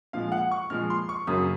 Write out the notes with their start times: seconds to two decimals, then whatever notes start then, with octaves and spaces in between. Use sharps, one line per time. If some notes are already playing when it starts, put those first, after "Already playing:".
0.13 A#2 F3 G#3 F5
0.32 F#5
0.51 C#6
0.70 A#2 F3 G#3 F6
0.90 C6
1.09 C#6
1.27 F#2 C#3 F#3 A#3 D#6